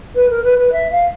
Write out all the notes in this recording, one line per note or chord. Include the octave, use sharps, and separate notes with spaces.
B4
A#4
B4
B4
E5
F5